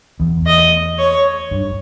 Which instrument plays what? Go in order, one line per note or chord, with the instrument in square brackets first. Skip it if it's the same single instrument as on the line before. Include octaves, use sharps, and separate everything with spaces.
[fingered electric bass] E2
[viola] D#5
C#5
[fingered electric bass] G2